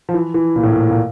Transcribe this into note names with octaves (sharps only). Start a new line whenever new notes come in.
F3
E3
E3
A#2
A2
A#2
A#2